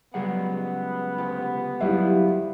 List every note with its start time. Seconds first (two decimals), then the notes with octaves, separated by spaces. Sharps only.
0.14 C#2 F#3 G3 B3 G#4 F#5
1.18 D2 F4 G4
1.81 F#3 G3 E4 G4 E5 F5